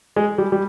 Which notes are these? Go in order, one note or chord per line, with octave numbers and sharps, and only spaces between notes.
G#3
G3
G3